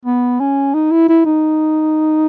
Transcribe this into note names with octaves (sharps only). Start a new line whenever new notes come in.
B3
C#4
D#4
E4
E4
D#4